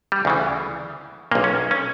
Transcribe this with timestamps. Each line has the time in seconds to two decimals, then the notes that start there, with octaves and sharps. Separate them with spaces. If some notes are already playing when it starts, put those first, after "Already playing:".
0.12 G3
0.25 D2 C#3 E3
1.32 B1 A#2 A#3
1.44 C#4
1.71 C#4